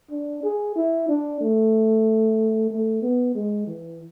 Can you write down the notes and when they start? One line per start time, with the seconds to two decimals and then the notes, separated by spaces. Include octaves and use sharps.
0.11 D4
0.43 G#4
0.76 E4
1.08 D4
1.41 A3
2.70 A3
3.02 B3
3.35 G#3
3.67 E3